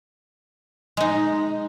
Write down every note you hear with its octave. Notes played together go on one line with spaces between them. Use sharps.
G#3 D#4